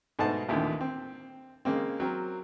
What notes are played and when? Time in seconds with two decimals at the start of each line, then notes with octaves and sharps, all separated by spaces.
0.19 G#2 B2 A3 D#5 F#5 A5
0.48 A1 D#2 A#2 D3 C4
0.81 C4
1.65 C#3 G#3 A#3 C4
2.00 F#3 C4 A#4